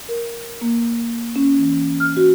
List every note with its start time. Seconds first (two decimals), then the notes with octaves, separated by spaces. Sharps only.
0.09 A#4
0.61 A#3
1.36 C#4
1.58 E3
2.00 F6
2.17 F#4